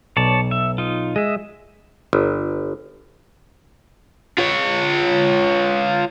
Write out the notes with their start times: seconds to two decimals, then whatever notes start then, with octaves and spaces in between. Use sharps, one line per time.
0.17 B1 C#5 D5 A5
0.51 E5
0.78 D#4 F4
1.16 G#3 D#5 E5
2.13 G1
4.38 F4 C#5